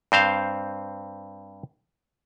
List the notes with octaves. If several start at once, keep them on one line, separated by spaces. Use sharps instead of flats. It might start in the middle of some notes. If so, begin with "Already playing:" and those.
G2 C4 C5 F5